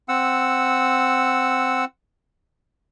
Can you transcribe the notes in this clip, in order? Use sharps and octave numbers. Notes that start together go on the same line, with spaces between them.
C4 F#5 E6